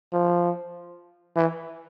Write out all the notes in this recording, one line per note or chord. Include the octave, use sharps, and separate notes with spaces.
F3
E3